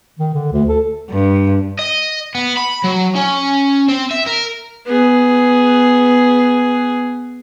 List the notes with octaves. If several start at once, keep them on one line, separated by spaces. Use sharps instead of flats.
D#3
D3
D2
A4
G2
D#5
B3
B5
F#3
C#4
C4
E5
A#4
B3 G#4